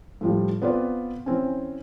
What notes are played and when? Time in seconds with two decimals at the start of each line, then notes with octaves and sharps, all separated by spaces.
0.21 A2 F3 G3
0.62 B3 C4 F4 B4 D5
1.26 E3 C4 C#4